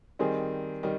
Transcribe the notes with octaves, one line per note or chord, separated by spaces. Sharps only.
D#3 G3 C4 D#4 G#4
D#3 G3 D#4